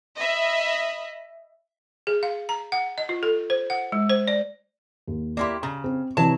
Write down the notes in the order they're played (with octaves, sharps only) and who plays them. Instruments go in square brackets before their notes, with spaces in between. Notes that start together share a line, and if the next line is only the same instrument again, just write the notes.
[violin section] D#5 E5 B5
[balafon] G#4
F5
A#5
F#5
D#5
F4
A4
C5
F#5
G#3
C5
D5
[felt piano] D#2
[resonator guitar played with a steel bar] A#3 E4 G4 [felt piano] D5 C6
[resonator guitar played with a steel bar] C#3 [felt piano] A#5
[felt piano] C4
[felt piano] C3 E3 [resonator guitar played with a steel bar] F#3 C#5 A5